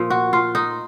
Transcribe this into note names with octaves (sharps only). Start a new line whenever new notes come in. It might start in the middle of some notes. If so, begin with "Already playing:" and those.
Already playing: A#2 F3
F#4
F4
D#4